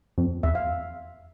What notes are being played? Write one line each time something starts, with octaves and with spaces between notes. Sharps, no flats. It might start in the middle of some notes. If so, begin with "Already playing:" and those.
F2
E2 E5
F5